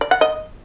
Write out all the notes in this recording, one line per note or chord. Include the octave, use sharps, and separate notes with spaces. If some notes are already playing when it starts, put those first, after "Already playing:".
D5
F#5
D#5